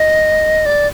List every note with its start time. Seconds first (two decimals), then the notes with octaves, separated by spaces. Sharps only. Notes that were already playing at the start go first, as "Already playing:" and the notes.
Already playing: D#5
0.66 D5